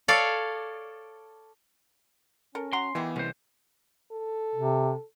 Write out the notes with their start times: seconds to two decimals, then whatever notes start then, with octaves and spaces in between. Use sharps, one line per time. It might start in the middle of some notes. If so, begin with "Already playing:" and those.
0.08 A4 C#5 D5 F5 A5
2.55 C#4 A4 A#4
2.73 F#4 A#5 C6
2.95 D#3 E3 B3 G4 G#4
3.16 C2 G#3 C#4 C5
4.12 A4
4.55 C3